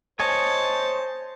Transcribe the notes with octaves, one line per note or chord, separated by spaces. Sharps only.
C5 C#5 D#5 G#5 A5